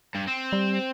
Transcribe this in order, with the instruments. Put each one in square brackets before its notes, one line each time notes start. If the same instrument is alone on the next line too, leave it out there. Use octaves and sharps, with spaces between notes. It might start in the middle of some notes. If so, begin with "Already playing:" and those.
[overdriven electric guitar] G2
C4
[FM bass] G3